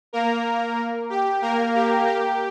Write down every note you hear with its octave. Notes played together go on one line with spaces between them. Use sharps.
A#3 A#4
G4
A#3 A#4
G4
G4